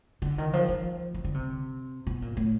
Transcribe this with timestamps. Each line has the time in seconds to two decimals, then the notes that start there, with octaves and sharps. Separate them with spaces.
0.22 D3
0.38 D#3
0.53 F3
0.69 F3
1.14 E3
1.25 D3
1.34 C3
2.07 B2
2.22 A#2
2.37 A2